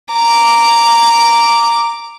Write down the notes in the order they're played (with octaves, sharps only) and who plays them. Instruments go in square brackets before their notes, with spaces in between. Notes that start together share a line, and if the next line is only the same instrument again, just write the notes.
[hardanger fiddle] A#5 D6